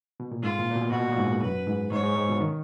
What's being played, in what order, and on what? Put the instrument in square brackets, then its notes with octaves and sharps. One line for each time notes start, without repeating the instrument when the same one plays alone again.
[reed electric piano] B2
A#2
[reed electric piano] G#2 [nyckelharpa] F4
[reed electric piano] A#2
A#2
B2
[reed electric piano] B2 [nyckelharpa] F#4
[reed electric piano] A#2
G#2
[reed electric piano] F#2 [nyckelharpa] B4
[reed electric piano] G#2
[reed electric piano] G#2 [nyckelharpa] C#5
[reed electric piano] G#2
G#2
B2
D#3